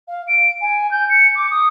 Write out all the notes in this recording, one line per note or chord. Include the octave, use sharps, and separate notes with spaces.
F5
D7
G#5
G6
C#7
D6
D#6